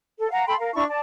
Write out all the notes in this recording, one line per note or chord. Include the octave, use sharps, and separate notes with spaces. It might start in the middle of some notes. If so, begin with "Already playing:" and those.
A4
F5 F#5 A#5
A4 G5 B5 C6
A#4 F5
D4 E4 A5 C#6
D5 A5